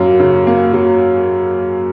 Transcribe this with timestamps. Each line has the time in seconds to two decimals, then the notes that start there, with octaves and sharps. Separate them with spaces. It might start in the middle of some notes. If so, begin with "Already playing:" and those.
Already playing: F#2 F#3 A#3
0.20 C#3
0.47 A#3
0.73 F#3